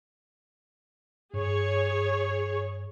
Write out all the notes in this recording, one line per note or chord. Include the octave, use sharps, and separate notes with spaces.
G2 G#4 C#5